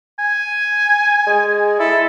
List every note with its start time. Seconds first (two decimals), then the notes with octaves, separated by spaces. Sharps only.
0.19 G#5
1.26 G#3
1.80 E4 A4